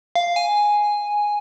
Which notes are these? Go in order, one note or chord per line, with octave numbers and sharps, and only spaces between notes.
F5
G#5